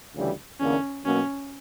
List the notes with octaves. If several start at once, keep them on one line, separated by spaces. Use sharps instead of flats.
D2 C#3 E3 G3
E2 D3 A#3 C#4
B2 F#3 A#3 C#4